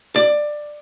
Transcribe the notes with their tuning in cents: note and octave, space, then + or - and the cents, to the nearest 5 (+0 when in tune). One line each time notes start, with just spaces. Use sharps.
D5 +15